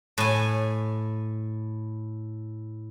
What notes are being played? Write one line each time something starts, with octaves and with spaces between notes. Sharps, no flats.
A2 G#5